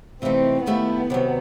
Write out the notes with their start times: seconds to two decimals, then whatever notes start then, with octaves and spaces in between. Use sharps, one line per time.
0.22 C3 E3 A3 C4 D#4
0.66 D#2 D#3 A3 B3 E4 G4
1.10 C3 D#3 F#3